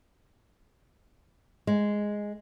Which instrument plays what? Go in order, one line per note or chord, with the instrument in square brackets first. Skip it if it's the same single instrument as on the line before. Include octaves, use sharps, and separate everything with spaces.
[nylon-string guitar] G#3